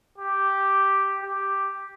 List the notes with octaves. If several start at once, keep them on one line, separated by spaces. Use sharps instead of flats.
G4
G4